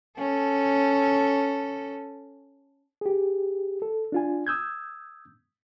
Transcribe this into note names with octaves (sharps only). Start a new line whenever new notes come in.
C#4 A4
G4 G#4
A4
D4 F4 G#5
D#6 E6 G6 G#6